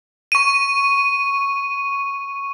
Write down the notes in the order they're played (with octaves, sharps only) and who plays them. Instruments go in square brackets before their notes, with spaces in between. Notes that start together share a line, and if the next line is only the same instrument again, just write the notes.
[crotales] C#6 D#7